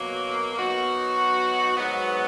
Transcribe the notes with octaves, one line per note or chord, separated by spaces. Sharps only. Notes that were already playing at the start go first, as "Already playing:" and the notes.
Already playing: B2 F#3 A#3
F#3 B3 D#4 F#4
G#2 F#3 B3